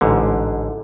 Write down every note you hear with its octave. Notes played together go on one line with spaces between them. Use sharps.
A1 G#2 D3